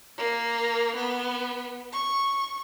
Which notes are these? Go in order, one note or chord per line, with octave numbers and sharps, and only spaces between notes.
A#3
B3
C#6